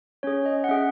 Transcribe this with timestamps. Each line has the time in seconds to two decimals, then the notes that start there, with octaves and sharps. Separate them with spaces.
0.23 C#4 G#4 C#5
0.46 D#5
0.64 F#5
0.69 C#4 G#4 E5